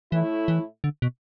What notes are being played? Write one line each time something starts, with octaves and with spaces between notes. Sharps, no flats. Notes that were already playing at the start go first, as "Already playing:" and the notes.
A2 E3 A3 E4
E3
D3
B2